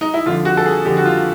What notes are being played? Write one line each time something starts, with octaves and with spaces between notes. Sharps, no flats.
D#4
E4
F2 D3 F4
F#4
A4
G#4
F2 D3 G4
F#4
F4